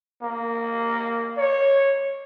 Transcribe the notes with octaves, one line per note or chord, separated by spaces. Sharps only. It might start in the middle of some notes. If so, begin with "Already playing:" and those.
A#3
C#5